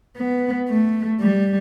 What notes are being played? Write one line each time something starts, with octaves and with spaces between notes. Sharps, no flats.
B3
A3
G3